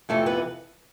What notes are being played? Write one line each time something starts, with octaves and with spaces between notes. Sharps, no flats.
F2 C3 E3 A3 A4
B3 B4